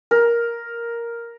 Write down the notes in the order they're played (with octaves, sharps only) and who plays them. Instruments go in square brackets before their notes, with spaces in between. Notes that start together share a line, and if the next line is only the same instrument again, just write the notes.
[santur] A#4